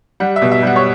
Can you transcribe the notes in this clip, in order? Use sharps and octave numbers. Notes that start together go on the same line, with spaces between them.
G3 F#5
E5
B2
E5
G3 F#5
C#5